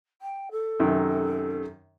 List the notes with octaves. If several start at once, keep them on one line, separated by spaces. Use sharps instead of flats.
G5
A4
F#2 C3 D#3